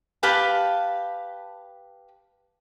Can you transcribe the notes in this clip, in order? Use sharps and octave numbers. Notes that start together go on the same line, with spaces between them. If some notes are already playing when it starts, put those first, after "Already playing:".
G4 B4 F5 A5